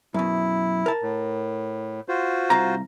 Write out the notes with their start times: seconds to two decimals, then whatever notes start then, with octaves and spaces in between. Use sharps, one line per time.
0.14 F#2 B2 E4
0.86 A#4 A5
1.02 A2
2.08 F4 F#4 C5
2.50 C2 F5 A#5